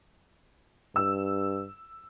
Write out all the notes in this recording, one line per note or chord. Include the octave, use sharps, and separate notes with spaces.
G2 E6